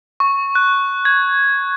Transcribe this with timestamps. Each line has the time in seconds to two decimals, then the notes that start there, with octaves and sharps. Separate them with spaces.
0.20 C#6
0.55 F#6
1.05 G#6